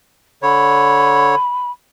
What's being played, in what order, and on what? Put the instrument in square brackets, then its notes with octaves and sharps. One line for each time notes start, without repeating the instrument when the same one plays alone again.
[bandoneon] D3 C#5 [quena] B5